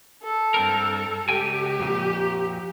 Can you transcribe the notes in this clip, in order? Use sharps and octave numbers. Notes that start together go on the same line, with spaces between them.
A4
G2 C4 A#4
C#2 G4 G5 G#5
F2 A#2